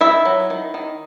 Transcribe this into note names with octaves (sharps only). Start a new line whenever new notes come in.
D#3 E4 E5
F#3
D#3
D#3